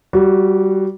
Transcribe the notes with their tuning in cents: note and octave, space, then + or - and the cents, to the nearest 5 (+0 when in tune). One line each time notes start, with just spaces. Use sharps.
G3 -15 F#4 +0